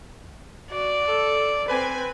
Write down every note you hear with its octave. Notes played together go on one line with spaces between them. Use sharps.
F#4 D5
A4
C4 B4 G#5